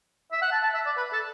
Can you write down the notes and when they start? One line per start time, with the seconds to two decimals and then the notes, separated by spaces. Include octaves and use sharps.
0.32 E5
0.42 F#5
0.52 A5
0.63 A5
0.74 E5
0.86 D5
0.97 B4
1.13 A4